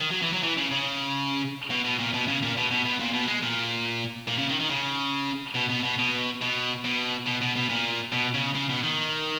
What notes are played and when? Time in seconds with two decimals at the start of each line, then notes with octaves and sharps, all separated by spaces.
0.01 D#3
0.11 F#3
0.22 E3
0.33 F#3
0.43 E3
0.57 C#3
0.71 C#3
1.71 B2
1.85 B2
1.99 A#2
2.14 B2
2.28 C#3
2.43 A#2
2.57 B2
2.71 B2
2.85 B2
2.99 A#2
3.14 B2
3.28 G#3
3.43 A#2
4.28 A#2
4.38 C#3
4.49 D#3
4.60 D#3
4.70 C#3
5.55 B2
5.70 B2
5.84 B2
5.99 B2
6.41 B2
6.85 B2
7.26 B2
7.41 B2
7.56 B2
7.69 A#2
8.12 B2
8.34 C#3
8.55 C#3
8.69 B2
8.84 D#3